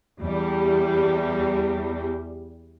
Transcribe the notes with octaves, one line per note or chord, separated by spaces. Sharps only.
E2 G3